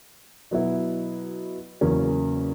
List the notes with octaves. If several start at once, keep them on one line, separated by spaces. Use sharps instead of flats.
B2 F#3 B3 E4
E2 C#3 F#3 A#3 C#4